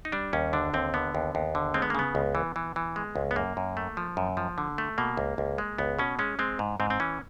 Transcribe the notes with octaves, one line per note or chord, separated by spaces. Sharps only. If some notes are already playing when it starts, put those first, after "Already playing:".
D#4
G3 D4
D#2 C#4
D3 D4
D#2 C4
D3 B3
D#2
D#2
D3
G#3 C4
B3
A#3
C#3 B3
C#2
E3
E3
E3
G#3
C#2
B3
F#2 A#3
F#2
A3
F3
F#2
F3
D3
A3
B2 A#3
C#2
C#2
G#3
C#2 B3
B2 C#4
G#3 C#4
G#3 C4
G#2
G#2 C4
C4
E3 C#4